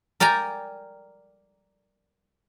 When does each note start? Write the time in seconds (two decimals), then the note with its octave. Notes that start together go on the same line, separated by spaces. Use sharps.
0.20 A#4 D5 G5 G#5 A#5